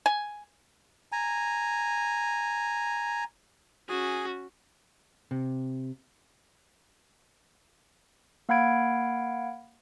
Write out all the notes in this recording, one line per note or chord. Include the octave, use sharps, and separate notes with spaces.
G#5
G#5 A#5
C#4 F#4 G#4 G#5
C3
A#3 F5 F#5 B5 G#6 D7